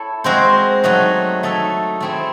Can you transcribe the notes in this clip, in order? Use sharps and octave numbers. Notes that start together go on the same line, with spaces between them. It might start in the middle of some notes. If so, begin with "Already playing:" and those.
Already playing: E4 A4 C#5
G#3 C4 F#4 C5
F#3 A3 D#4 F#4
A3 D#4 A4 C#5 E5
A3 C4 E4 G#4